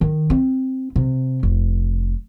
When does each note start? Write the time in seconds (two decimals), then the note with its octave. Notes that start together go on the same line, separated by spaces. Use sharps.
0.01 D#3
0.30 C4
0.96 C3
1.43 F1